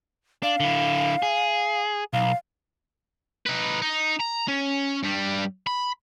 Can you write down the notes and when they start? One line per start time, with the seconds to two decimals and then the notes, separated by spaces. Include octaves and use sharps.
0.43 D4 F5
0.60 D3 E4
1.23 G#4
2.13 B1 F5
3.46 D#4 B4
3.82 D#4
4.19 A#5
4.48 C#4
5.03 G2 G3
5.67 B5